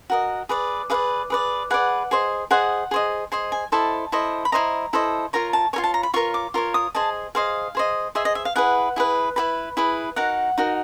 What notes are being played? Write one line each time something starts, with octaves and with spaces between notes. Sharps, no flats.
F#4 A#4 D#5
G#4 B4 D5
G#4 B4 D5 F5
G#4 B4 D5
G#4 B4 D5 F#5
G#4 C5 D#5
G#4 C5 D#5 F#5
G#4 C5 D#5
G#4 C5 D#5
G#5
E4 A4 C5 D#5 A5
E4 A4 C5 D#5
B5
E4 A4 C5 D#5 A#5
E4 A4 C5 D#5
F4 A#4 C#5 A#5
A5
F4 A#4 C#5 G#5
A5
A#5
B5
F4 A#4 C#5 C#6
D6
F4 A#4 C#5
D#6
G#4 C5 D#5 A5
G#4 C5 D#5 F5
G#4 C5 D#5
G#4 C5 D#5 E5
D#5
E5
F5
E4 G#4 B4 F#5
E4 G#4 B4
E4 G#4 B4 B5
E4 G#4 B4
D#4 F#4 A#4 F#5
D#4 F#4 A#4